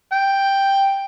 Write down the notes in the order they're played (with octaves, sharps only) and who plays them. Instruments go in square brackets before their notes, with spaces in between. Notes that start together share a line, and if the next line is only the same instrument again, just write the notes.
[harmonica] G5